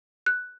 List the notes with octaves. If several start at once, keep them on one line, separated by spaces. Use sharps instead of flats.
F#6